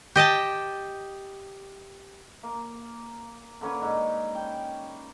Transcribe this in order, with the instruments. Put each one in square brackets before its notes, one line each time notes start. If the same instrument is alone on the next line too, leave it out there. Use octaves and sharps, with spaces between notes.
[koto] G4 D#5 G5 A5
[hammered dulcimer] A#3
D3 A#3 C#4 B4
G#2 D#4
G5